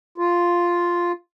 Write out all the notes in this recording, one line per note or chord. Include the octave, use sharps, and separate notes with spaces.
F4